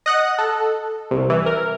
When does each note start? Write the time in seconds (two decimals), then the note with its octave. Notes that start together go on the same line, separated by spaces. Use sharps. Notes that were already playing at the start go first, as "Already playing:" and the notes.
0.06 D#5 F#5 F#6
0.38 A4
1.11 C2
1.30 E3
1.46 A#4